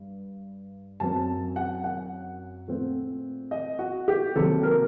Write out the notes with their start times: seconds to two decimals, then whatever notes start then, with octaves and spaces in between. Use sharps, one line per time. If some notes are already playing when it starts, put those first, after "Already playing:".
Already playing: G2
1.00 F#2 F#3 C4 A5
1.56 F#5
1.84 F#5
2.67 A#2 A3 C4
3.51 D#5
3.79 F#4
4.08 G4
4.35 C3 D#3 F#3 A#3 A4
4.63 A#4